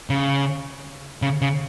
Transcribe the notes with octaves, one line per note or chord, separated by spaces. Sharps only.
C#3
C#3
C#3